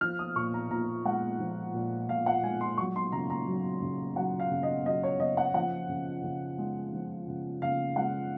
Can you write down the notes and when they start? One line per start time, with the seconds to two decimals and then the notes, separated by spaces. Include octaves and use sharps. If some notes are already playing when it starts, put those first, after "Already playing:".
0.01 F3 F6
0.19 D#6
0.36 A#2 C#6
0.54 A#5
0.70 A#2 A#5
1.05 G#3 F#5
1.40 F3
1.74 A#2
2.09 A#2 F5
2.26 F#5
2.43 G#3 G#5
2.61 C6
2.78 F#3 C#6
2.96 C6
3.12 C#3 A#5
3.30 A#5
3.47 F#3
3.82 C#3
4.16 F#3 F#5
4.40 F5
4.52 C#3
4.63 D#5
4.86 F#3 D#5
5.03 C#5
5.20 C#3 D#5
5.37 F#5
5.54 F3 F#5
5.89 C#3
6.24 C#3
6.58 G#3
6.93 F3
7.28 C#3
7.62 C#3 F5
7.96 G#3 F#5